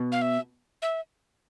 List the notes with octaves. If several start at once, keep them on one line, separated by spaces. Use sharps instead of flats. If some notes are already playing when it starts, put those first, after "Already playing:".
Already playing: B2
F5
E5
E5